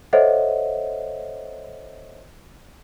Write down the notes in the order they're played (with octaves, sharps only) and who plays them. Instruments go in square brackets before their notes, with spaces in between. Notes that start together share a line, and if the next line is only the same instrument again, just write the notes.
[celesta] A4 C5 C#5 D#5 E5 F#5